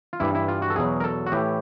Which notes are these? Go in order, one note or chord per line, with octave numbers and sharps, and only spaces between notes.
F4
G2 E3 E4
E4
F4
F#4
A4
E2 B2 F#3 G#4
A#4
A4
F#4
A2 E3 G4